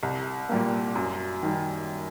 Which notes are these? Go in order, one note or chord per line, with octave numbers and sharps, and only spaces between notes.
C2
A#2 G3 A#3
F#2
D#3 G3